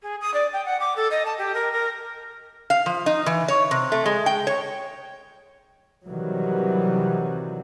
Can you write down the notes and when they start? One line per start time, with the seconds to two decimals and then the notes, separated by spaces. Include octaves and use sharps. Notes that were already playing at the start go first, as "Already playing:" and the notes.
0.02 G#4
0.20 D#6
0.34 D5
0.53 G5
0.65 F#5
0.80 D6
0.96 A4
1.10 D#5
1.25 A5
1.38 G4
1.54 A#4
1.72 A#4
2.70 F5
2.86 F3
3.06 D#4
3.26 E3
3.48 C#5
3.71 C3
3.92 A3
4.06 G#3
4.26 G5
4.47 C#5
6.07 C3 D#3 E3 F#3 G3